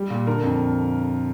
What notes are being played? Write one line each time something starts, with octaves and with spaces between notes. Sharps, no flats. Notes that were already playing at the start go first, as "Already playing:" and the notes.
Already playing: G3
A#2
D3 A#4
F2